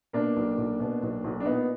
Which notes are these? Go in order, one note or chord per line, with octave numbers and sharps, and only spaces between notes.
B2 A#3 D4
B1
B1
B2
B1
B1
D4
A#2 B3 D#4